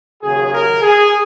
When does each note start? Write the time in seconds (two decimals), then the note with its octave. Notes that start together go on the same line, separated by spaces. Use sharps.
0.23 D#2 C#3 F#3 G#4
0.53 A#4
0.82 G#4